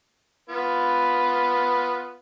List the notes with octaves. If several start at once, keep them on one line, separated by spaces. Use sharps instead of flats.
B3 F4 B4